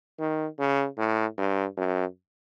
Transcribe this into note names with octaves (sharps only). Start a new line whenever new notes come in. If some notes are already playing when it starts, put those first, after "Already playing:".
D#3
C#3
A2
G2
F#2